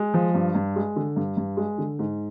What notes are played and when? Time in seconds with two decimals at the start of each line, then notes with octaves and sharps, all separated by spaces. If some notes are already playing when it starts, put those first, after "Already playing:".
Already playing: G#3
0.14 F3
0.34 G2
0.55 G2
0.76 G#3
0.96 D3
1.16 G2
1.37 G2
1.57 G#3
1.78 D3
1.99 G#2